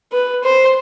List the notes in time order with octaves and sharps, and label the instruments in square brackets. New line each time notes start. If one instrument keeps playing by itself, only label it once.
[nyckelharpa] B4
C5